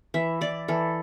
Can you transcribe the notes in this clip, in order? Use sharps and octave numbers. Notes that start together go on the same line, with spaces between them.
E3 E5
E3 D5
E3 A4